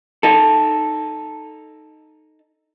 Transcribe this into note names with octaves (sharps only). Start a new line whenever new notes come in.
D#4 A4